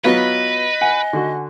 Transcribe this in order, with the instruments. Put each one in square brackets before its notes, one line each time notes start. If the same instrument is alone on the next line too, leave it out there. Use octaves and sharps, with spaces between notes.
[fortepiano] F#3 B3 F4 [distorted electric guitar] B4 [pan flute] D#5
[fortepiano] F#5 [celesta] G#5
[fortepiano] D3 F#4